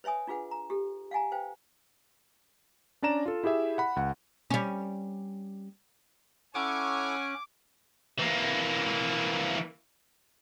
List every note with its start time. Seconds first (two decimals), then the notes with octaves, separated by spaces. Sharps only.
0.04 B4 C#5 E5 G#5 D#6
0.27 D4 F4 G#4 B4 F#5
0.51 A#5
0.70 G4 A4
1.11 F5 F#5 G#5 A#5
1.32 B4 C5 F5 G5
3.02 C#4 D4 D5 A#5 E7
3.26 F4 A4
3.44 E4 G4 G#4 E5
3.78 F#5 B5
3.96 C#2 F#5
4.50 G3 C#4
6.55 C#4 E4 A4 C#5 F#5 G#5 D6
8.20 E3 A#3